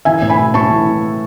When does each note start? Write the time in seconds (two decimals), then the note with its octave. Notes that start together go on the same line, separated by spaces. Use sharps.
0.05 E3 E5 G#5
0.22 A2
0.30 G#5 B5
0.39 A2
0.54 A2 A5 C#6
0.70 E3